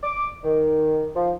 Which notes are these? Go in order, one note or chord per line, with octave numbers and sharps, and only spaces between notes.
D6
D#3
F3